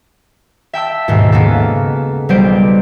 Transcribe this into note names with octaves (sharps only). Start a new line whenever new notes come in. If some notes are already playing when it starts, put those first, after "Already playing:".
E5 G5 A5 E6
D#2 G#2 B2
C#3 A#3 B3 A4
B1 G3 B3 C5 D7